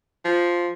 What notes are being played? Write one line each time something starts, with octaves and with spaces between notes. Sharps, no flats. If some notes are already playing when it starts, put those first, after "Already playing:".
F3